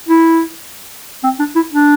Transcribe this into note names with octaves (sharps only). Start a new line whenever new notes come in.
E4
C4
D4
E4
D4